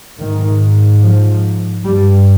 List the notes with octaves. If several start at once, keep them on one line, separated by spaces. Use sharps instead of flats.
G#2 D#3
F3
G2 G3